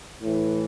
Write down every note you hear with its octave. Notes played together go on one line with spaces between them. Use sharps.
A2 E3